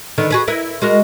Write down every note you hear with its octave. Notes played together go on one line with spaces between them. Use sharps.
D3 D#3 B3
F#4 G#4 B4
E4 A#4 B4
G#3 F#4 A#4